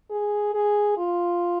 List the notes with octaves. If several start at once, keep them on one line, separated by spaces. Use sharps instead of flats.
G#4
G#4
F4